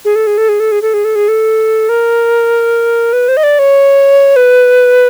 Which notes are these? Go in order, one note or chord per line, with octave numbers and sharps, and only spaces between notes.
G#4
A4
G#4
A4
G#4
A4
G#4
A4
G#4
A4
G#4
A4
A#4
B4
C5
D#5
D5
C#5
B4